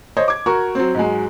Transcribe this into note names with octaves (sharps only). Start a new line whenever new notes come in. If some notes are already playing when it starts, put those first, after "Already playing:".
C5 C#5 D#5
D6 G#6
F#4 A#4 C#6
F#3 C4
G#2 F#3 G#3